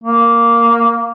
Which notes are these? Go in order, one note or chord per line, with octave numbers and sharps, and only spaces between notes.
A#3